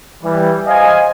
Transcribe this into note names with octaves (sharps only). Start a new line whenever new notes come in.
E3 G3
C5 D#5 F5 G#5